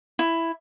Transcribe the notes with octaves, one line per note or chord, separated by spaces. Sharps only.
E4